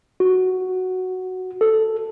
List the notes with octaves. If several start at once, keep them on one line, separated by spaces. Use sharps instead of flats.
F#4
A4